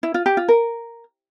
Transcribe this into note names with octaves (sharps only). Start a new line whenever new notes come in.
E4
F4
G4
F4
A#4